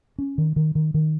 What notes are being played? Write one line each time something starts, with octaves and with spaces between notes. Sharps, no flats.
C#4
D#3
D#3
D#3
D#3